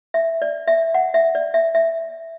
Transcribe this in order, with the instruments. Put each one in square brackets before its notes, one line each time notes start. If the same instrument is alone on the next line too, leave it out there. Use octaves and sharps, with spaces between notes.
[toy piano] E5
D5
E5
F#5
E5
D5
E5
E5